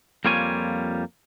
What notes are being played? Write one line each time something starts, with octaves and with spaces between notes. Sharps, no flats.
F2 G3 A#3 F4 C#5 G#5